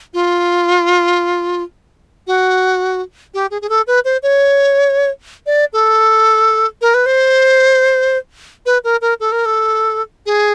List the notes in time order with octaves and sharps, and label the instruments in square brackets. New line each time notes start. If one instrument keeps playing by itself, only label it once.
[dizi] F4
F#4
G4
G#4
G#4
A4
B4
C5
C#5
D5
A4
A#4
B4
C5
B4
A#4
A#4
A4
A#4
A4
G#4